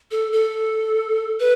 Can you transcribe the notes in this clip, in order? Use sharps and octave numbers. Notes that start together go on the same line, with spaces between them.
A4
A4
B4